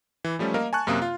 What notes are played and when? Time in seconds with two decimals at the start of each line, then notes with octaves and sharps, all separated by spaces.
0.24 E3
0.39 F3 G3 A3 C#4
0.54 A#3 A#4 D#5 F5
0.73 G#5 A5 C#6 F#6
0.87 F#2 C3 A#3 F5 D#6
1.02 F4 F5